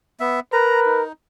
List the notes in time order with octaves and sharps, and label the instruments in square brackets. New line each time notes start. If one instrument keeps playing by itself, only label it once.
[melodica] B3 E5
[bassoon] A#4 [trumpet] B4 [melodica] A#5
[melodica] D#4